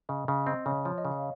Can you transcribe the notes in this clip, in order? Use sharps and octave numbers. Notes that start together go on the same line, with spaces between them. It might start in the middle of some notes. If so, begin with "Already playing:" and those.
C#3 D#5
C#3 D#5
C4 D#5
C#3 C#5
F3 C#5
D#5
C#3
F5